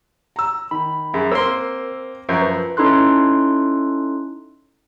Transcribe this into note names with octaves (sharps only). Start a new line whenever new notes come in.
A#5 E6
D#3 B5
F#2 G#4
A#3 C4 A#4 C6 E6
F#2 F3 A#5 C#6 G6 G#6
B4
C#4 D#4 E4 A4 C6 F#6